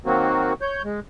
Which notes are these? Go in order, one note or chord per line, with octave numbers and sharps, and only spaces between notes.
D#3 F#3 A#3 C4 F#4
C#5 G6
G#3